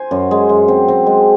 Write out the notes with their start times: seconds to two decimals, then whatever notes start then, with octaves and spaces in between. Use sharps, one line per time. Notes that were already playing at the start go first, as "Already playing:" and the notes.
Already playing: C5 G#5
0.11 F#2
0.31 G#3
0.49 F#2
0.68 C4
0.88 C4
1.07 G#3